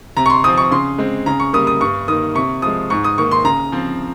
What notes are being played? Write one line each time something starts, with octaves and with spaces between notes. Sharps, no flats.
C3 A#5
C#6
C6
F3 C4 D#6
C#6
C#3 C6
G#3 C4
C#3 A#5
C#6
G3 A#3 D#6
D#6
G2 C#6
D#3 A#3 D#6
C3 C#6
F3 G#3 D#6
G#2 C#6
D#6
D#3 A#3 C#6
C6
C#3 A#5
F3 C4